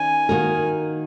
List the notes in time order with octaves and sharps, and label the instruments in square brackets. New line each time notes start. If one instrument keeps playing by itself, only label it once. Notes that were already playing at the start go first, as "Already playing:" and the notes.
Already playing: [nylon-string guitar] D#3 C#4 [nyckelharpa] G#5
[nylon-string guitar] D#3 A#3 F#4 A#4